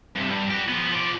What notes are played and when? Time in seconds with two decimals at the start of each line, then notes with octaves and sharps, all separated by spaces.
0.15 G2 C3
0.29 G2
0.50 F#4 G4
0.68 F3 B3
0.91 F3 D5